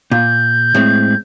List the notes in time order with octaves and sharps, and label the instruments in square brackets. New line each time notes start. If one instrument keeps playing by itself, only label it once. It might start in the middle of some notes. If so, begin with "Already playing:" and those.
[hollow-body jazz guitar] A#2 [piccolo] G6
[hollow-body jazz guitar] A2 G#3 C4